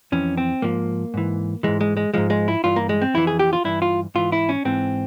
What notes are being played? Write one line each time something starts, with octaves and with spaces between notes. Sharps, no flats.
F2 E3 C#4
C4
G#2 F3 A#3
G#2 E3
G#2 E3 G#3
G#3
G#3
G#2 F3 G#3
G#3
E4
G2 E3 F4
A#3
G#3
C4
F2 E3 E4
G#4
G4
F4
G2 E3 E4
F4
G#2 E3 F4
E4
C#4
G#2 E3 C4